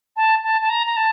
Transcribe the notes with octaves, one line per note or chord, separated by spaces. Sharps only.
A5
A5
A5
A#5
A#5
A5